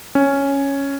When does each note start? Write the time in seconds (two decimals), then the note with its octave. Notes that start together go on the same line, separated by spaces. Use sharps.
0.15 C#4